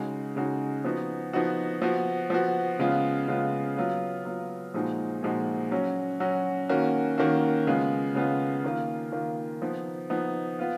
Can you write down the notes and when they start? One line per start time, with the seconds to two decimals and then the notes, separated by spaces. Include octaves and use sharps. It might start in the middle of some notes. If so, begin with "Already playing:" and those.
Already playing: C#3 G#3 D#4 F#4
0.36 C#3 G#3 D#4 F#4
0.84 F3 B3 D#4 F#4
1.33 F3 B3 D#4 F#4
1.82 F3 B3 F#4
2.30 F3 B3 F#4
2.79 C#3 G#3 B3 F4
3.28 C#3 G#3 B3 F4
3.77 F#3 B3 F4
4.25 F#3 B3 F4
4.74 A#2 F3 G#3 D#4 F#4
5.23 A#2 F3 G#3 D#4 F#4
5.71 F#3 C#4 F#4
6.20 F#3 C#4 F#4
6.69 D#3 A#3 C#4 F#4
7.18 D#3 A#3 C#4 F#4
7.67 C#3 G#3 B3 F4
8.15 C#3 G#3 B3 F4
8.64 D#3 A#3 F4
9.12 D#3 A#3 F4
9.62 F3 B3 D#4
10.10 F3 B3 D#4
10.59 B3 F4